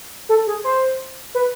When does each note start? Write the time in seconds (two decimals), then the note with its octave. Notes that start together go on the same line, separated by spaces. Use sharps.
0.29 A4
0.47 G#4
0.64 C5
1.35 B4